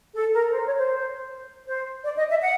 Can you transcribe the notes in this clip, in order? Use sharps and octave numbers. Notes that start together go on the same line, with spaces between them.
A4
A#4
C5
C#5
C5
C5
D5
D#5
E5
F#5